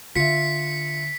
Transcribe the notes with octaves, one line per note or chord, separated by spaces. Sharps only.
D3 F4 E5 B6 C#7